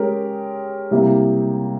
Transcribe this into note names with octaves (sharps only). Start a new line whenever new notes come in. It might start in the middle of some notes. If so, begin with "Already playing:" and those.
Already playing: G#3 C#4 G4 A#4
C3 G3 A#3 E4 G4